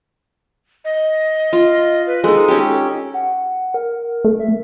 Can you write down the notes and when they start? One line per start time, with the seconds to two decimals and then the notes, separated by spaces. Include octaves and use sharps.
0.85 D#5
1.53 F4
2.07 B4
2.24 G#3 D#4 A4
2.48 C#4 G4
3.14 F#5
3.74 A#4
4.25 A3
4.39 E5